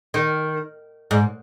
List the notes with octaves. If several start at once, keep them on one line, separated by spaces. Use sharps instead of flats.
D#3
G#2